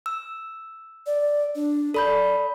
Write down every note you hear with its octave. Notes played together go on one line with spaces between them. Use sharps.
E6
D5
D4
A4 D5 B5 G6